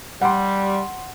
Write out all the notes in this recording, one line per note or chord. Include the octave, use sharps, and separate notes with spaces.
G3 F#5 C6